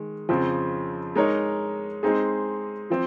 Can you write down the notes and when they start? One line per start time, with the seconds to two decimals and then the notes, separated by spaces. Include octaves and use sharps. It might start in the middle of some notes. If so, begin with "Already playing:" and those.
Already playing: D#3 G#3
0.29 F2 C#3 F3 C4
1.16 G#3 D#4 A#4 C#5
2.03 G#3 C4 D#4 G#4
2.90 F3 C4